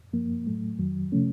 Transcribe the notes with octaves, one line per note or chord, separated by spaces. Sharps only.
F#2 F3 A#3
A2 F#3 A3
F2 D#3 F#3
C3 F3 A3 C#4